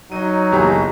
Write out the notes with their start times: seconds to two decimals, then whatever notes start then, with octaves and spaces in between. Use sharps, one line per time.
0.12 F#3 D#4 D#5 D#7
0.52 F#1 B1 G4 G#4 A#5